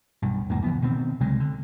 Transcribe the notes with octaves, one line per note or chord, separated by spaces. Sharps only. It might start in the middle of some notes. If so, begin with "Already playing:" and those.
B1 G2
E2 G#2 C3 A#3
C#2 E3 F3 B3
B2 D#3 G#3 C4
C2 C#3 F#3 G#3
D3